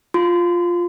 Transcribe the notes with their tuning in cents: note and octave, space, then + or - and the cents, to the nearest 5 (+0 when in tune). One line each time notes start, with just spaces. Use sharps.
F4 +0 C6 -30